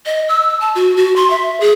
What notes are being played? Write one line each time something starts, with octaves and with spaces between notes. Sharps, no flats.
D#5
E6
A5
F#4
F#4
C6
E5
G#4